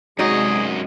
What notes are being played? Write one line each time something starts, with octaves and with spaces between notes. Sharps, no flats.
F#2 C3 G#3 D#4 F#4 G#4 D5 D#5